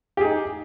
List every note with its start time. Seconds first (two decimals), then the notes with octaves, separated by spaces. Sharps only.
0.17 G4
0.21 G#4
0.24 D#4